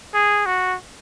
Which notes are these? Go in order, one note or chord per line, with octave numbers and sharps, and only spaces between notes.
G#4
F#4